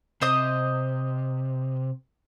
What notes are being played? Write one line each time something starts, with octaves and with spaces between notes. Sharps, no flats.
C3 C5 D#5 D#6